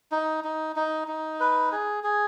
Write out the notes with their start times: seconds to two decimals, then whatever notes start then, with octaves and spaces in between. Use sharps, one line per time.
0.12 D#4
0.44 D#4
0.76 D#4
1.08 D#4
1.40 B4
1.72 G#4
2.04 G#4